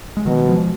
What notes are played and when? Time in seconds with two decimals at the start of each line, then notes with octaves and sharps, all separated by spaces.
0.17 G#3
0.26 B2 D#3 F#3
0.47 F3 G#3